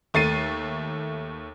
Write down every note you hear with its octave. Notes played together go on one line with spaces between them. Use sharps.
D#2 A3 A6 C7 D#7